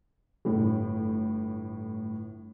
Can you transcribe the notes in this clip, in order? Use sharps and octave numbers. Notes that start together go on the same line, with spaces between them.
G1 A2